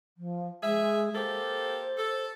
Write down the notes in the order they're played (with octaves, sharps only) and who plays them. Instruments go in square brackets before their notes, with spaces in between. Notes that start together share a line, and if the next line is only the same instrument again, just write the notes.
[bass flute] F3
[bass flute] G#3 [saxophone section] G#4 E5
[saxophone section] A#3 G4 A4 [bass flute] C5
[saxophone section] A4